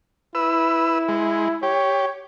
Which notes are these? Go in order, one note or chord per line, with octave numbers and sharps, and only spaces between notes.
E4 B4 E6
G#3
G4 C#5